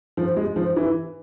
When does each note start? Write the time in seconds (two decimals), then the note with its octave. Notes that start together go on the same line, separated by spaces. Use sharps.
0.17 F3
0.36 G#3
0.56 F3
0.76 E3